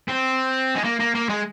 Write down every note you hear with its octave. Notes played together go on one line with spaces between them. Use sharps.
C4
G#3
A#3
A#3
A#3
G#3